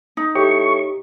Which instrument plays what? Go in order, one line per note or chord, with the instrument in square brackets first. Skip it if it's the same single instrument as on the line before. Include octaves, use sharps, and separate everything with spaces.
[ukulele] D#4
[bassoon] A2 [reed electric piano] G4 [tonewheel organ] C#6